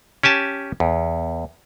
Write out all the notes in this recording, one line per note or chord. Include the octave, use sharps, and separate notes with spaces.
C#4 G4 G#5 A5
E2